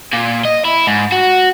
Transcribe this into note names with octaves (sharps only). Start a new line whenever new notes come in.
A#2
D#5
E4
G#2
F#4